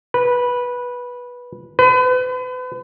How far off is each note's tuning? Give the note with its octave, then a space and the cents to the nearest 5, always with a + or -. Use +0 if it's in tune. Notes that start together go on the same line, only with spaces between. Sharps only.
B4 -10
B4 +40